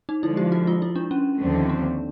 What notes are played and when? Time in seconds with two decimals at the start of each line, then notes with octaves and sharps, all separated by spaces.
0.09 D#4
0.23 D3 F3 G#3 E4
0.37 G4
0.52 F#4
0.67 F4
0.82 E4
0.95 D4
1.11 C#4
1.40 D#2 D3 F3 A3 C4
1.70 D4